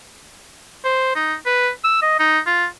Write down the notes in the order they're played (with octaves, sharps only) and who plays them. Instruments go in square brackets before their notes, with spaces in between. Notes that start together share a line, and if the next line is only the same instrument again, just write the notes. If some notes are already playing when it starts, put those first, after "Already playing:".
[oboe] C5
D#4
B4
E6
D#5
D#4
F4